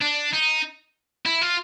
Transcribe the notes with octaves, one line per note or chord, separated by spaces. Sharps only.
D4
D#4
E4
F4